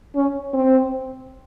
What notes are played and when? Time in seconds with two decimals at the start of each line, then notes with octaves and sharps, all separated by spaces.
0.16 C#4
0.54 C4